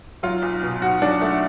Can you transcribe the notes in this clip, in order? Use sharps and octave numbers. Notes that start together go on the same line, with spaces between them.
F#3 F4
B1
B2
B1 F#4
F#3 D4
B1 A3